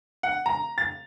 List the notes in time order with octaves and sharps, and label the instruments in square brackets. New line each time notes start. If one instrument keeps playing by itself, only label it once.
[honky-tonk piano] F#5
A#5
A6